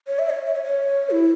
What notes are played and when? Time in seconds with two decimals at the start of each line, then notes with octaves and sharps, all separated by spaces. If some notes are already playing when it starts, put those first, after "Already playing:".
0.08 C#5
0.19 E5
0.30 C#5
0.46 E5
0.54 C#5
0.64 C#5
1.10 E4